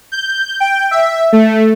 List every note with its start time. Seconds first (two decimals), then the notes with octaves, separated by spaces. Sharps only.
0.12 G6
0.60 G5
0.91 E5
1.32 A3